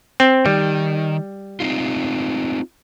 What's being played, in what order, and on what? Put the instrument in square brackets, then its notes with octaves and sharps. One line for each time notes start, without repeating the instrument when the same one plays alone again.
[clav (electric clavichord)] C4
[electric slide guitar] D#3 [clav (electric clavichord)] G3
[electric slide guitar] C4 D#4 F4